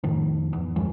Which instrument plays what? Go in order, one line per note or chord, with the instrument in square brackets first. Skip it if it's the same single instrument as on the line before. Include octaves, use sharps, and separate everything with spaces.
[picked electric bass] F2 A2 D#3 F3
E2
G1 F#2 F3 G#3